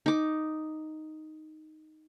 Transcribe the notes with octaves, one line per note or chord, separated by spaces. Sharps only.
D#4 D6